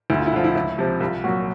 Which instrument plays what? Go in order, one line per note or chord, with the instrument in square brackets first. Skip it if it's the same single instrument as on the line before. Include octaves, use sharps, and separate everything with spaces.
[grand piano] D2 E4
F4
E4
D3 F3 F4
E4
C#2 E4
C3 F3
C2 F4
A#2 F#3 F#4